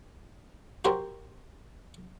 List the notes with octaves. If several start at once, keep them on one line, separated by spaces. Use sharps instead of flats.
F#4 G4 A#4 C5